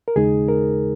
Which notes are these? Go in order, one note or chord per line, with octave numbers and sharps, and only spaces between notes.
A#4
D#2 C#3 G#3 D#4 G#4
A#4